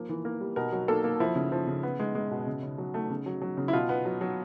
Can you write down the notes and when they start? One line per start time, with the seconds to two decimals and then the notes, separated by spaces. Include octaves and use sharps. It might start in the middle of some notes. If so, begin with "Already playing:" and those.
Already playing: F3 A#3
0.09 E3
0.25 A#3
0.41 G3
0.56 B2 A#4
0.73 F#3
0.88 A#3 A4
1.04 A#3
1.20 F3 E4
1.35 C#3
1.52 F3
1.67 C#3
1.83 B3
2.00 G#3
2.15 G#3
2.31 B2
2.47 C#3
2.63 C#3
2.78 F#3
2.94 A3
3.10 C#3
3.26 F#3
3.42 F#3
3.57 C#3
3.68 E4
3.73 B2 F4
3.89 B3
4.05 F#3
4.21 F#3